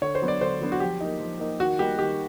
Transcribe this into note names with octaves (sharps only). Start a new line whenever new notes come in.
D3 C#5
C5
F#3 B3 D4
D5
D3 C5
F#3 B3 D4
F#4
F3 G4
A#3 D#4
F3
A#3 D#4
D#3 F#4
G3 A#3 D#4 G4
D#3 G4